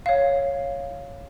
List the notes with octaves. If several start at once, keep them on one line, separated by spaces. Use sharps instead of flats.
C#5 F5